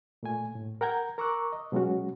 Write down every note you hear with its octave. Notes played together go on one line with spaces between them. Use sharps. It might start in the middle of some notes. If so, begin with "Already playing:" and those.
A#2 A3 G#5
A2
A#4 F#5 G5 A#5 G6 G#6
A#4 A#5 C#6 D6 E6 F#6
D#5
B2 F#3 G#3 C#4 F#4